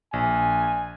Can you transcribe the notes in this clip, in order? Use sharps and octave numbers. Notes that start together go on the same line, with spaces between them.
A#1 G#5